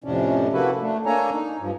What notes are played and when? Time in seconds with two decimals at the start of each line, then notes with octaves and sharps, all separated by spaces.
0.04 F2 A2 C3 C#4 D4
0.53 A#3 E4 F#4 A4 B4
0.82 A3 D4
1.06 A#3 D4 A4 C#5 G#5 A#5
1.33 D#4
1.61 G2 F3